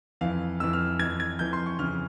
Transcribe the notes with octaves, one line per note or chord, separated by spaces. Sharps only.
F2 E3 F5
F2 E3 E6
F6
F2 E3 G#6
G#6
F2 E3 G6
C6
C#6
F2 C#3 E3 F6